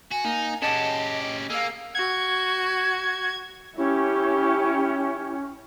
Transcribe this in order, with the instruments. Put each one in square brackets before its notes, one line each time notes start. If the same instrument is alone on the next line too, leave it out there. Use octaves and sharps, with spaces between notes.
[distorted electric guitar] F#4 [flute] G#5
[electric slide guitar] A#3 [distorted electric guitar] D#4
[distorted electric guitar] C#4 G4 [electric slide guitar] G#4 F#5 A5 [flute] D#5
[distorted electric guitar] A#3 [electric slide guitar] G#4 F5 [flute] E6
[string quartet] F#4 [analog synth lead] G#6
[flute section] C#4 [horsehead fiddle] E4 G4